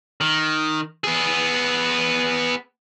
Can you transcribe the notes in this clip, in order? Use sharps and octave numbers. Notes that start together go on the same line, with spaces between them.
D#3
B3 G#4